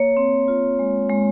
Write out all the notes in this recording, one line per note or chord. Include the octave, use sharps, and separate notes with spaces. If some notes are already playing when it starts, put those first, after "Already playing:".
Already playing: A#3 C#5
C4
F4
G#3
G#3